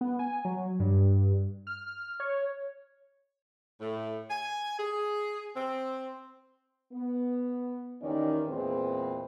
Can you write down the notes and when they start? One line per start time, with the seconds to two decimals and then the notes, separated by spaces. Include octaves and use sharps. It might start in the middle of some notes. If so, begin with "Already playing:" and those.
0.01 B3
0.19 G#5
0.45 F#3
0.80 G2
1.67 F6
2.20 C#5
3.81 A2
4.30 G#5
4.79 G#4
5.55 C4
6.93 B3
8.02 D#2 D#3 E3 C#4 D#4 D5
8.48 E2 A#2 G#3 C4 G#4 B4